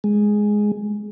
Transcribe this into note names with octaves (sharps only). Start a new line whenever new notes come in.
G#3